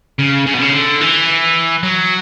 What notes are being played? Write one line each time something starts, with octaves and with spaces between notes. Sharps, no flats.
C#3
C#3
B2
C#3
D3
E3
F#3